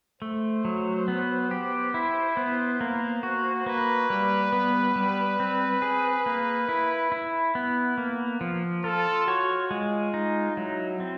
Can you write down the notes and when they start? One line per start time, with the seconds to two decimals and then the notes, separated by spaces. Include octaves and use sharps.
0.21 A3 C5
0.65 F#3
1.08 B3
1.51 G4
1.94 E4
2.37 B3
2.81 A#3
3.23 F#4
3.66 A#3 B4
4.10 G3
4.53 B3
4.96 G3
5.40 C4
5.82 G#4
6.26 A#3
6.69 E4
7.12 E4
7.55 B3
7.98 A#3
8.41 F3
8.84 F4 A4
9.27 F#4 C#5
9.71 G#3 F4
10.14 D#4
10.57 F#3 E4
11.00 C4